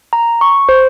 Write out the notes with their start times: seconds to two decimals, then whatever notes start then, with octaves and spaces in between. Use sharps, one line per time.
0.13 A#5
0.41 C#6
0.69 C5